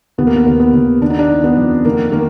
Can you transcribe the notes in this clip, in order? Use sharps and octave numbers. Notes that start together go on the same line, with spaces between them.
D#2 B3
A#3
B3
D#2
B3
D#2
D#3 D4
D#4
D4
D#3
B3
F2
D#3 A#3
D#3 A#3